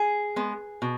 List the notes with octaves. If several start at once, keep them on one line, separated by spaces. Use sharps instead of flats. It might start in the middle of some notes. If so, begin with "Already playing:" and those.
Already playing: G#4
G#3 B3
B2